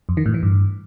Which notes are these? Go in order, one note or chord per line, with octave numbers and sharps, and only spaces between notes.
F2
D#3
A2
E3
G2